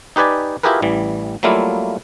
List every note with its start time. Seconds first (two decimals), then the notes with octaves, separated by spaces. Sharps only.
0.16 D#4 G4 B4 D5 G#5
0.63 E4 F4 G4 G#4 A#4 B4
0.82 A1 E3 G3
1.43 F#3 G3 A3 A#3 E4 F4